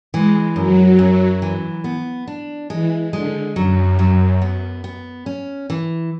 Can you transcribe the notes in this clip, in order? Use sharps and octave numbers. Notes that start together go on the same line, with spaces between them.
E3 G#3
F#2 F#3
F#2
E3
B3
D4
E3 G#3
D3 G#3
F#2 F#3
F#3
B3
B3
C#4
E3